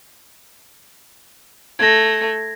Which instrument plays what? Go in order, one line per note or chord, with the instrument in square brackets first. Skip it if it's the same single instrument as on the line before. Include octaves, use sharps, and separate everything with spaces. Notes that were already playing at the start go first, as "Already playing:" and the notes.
[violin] A3 [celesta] G#6 A#6